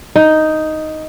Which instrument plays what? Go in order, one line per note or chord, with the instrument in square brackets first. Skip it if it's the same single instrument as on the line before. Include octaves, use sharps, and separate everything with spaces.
[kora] D#4